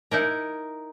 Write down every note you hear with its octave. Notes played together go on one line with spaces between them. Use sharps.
D#4 E4 A#4